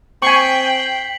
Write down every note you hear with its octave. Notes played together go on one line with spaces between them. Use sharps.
C4 G5 G#5 C#6 B6 C7 F#7